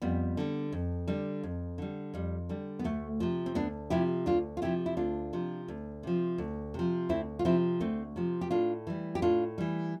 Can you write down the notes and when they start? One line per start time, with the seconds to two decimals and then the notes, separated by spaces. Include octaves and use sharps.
0.02 F2 G3 B3
0.37 D3 G3
0.72 F2
1.08 D3 G3
1.43 F2
1.78 D3 G3
2.14 F2 G3
2.49 D3 G3
2.79 B3
2.84 D2 A3
3.20 C3 F3
3.46 C4
3.55 D2 B3 D4
3.90 C3 F3 E4 G4
4.26 D2 D4 F4
4.57 F4
4.62 C3 F3 E4 G4
4.86 E4
4.97 D2 D4 F4
5.33 C3 F3
5.68 D2
6.03 C3 F3
6.38 D2
6.74 C3 F3
7.09 D2 C4 E4
7.39 F4
7.45 C3 F3 C4 E4
7.80 D2 A3 C4
8.16 C3 F3
8.41 G4
8.51 A2 D4 F4
8.87 E3 G3
9.15 G4
9.22 A2 D4 F4
9.58 E3 G3